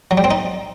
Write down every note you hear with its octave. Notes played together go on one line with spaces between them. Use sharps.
F#3
G3
C4
D#4